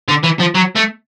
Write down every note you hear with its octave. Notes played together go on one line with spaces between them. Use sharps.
D3
E3
F3
F#3
A3